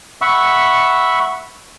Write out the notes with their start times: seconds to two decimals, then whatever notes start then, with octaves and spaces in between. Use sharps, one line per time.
0.21 E5 F#5 B5 C#6 E6